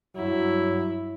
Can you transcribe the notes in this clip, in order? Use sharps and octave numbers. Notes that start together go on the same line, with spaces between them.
G2 F#3 E4